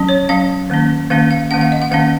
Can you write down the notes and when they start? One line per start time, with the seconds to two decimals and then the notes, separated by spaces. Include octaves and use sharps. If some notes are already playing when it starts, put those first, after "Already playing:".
Already playing: F#3 C#4
0.09 C#5
0.29 F#3 C#4 F5
0.70 D#3 A#3 C#4
1.10 D#3 A#3 C#4 F5
1.31 F5
1.51 D#3 A#3 C#4 F#5
1.61 F5
1.72 D#5
1.82 F#5
1.92 D#3 A#3 C#4 F5